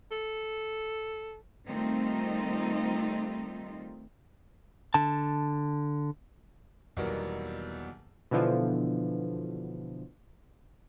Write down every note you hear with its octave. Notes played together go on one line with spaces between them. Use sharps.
A4
D#3 G3 A3 C4 D#4 F4
D3 A5
E2 B2 D#3 F#3 G3 A#3
B2 D3 E3 F3